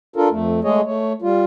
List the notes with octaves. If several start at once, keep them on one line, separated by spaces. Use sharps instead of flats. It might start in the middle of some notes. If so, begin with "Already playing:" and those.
D4 F4 A4 A#4
F2 A3
G#3 A3 G#4 C#5 D#5
A3 C#5
G3 F4